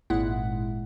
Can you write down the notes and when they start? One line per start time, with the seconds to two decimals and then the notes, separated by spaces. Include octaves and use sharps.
0.10 G#1 A#2 G#3 E4 F#5